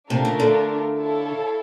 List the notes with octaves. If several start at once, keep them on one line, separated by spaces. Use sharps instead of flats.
C3 A3 D4 F4 A#4
C#3
D3
E4 A4 C#5 F5